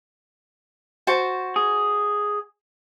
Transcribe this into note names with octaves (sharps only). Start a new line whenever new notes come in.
F#4 C5 A5
G#4